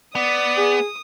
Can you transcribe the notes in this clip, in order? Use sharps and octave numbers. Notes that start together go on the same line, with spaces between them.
B3 D5 D#6
G#4